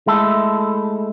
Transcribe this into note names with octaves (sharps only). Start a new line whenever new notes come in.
G#3 A3 E4 A4